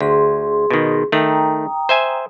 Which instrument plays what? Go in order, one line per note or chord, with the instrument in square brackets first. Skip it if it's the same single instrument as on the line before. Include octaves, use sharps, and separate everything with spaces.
[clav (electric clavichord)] D2 [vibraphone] G#4 C6
[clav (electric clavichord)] B2 D#3
[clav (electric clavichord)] D#3 A3 [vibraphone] G5 A#5 D#6
[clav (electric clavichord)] C5 E5 G#5